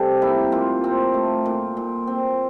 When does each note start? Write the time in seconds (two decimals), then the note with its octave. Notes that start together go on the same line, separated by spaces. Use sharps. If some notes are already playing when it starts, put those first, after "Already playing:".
Already playing: C3 G3 G4 A4
0.22 A#3 E4
0.52 A#2 F4
0.84 C4
1.14 A3
1.46 A#2
1.77 A#2
2.07 C4